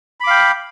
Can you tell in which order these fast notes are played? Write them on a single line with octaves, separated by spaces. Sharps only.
B5 D6 F5 G5